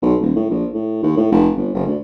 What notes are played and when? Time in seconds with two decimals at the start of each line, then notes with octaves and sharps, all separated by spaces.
0.02 B1
0.21 D#1
0.36 A2
0.50 A#1
0.74 A2
1.03 D#2
1.17 A2
1.32 F1
1.57 G1
1.74 F#1
1.86 D2